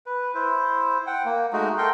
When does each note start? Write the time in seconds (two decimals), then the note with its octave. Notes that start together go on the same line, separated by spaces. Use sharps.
0.06 B4
0.34 E4 C5
1.07 F#5 G5
1.25 A#3
1.53 G#3 A3 D#4 F#4
1.78 A4 A#4 G5 C6